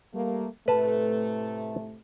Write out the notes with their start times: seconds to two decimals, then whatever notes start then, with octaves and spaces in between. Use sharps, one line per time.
0.14 G3 A3 A#3
0.68 A2 C3 A3 B4 A5